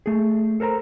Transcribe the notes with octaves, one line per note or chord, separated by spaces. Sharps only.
A3 G#4
A4 A#4 C5 A#5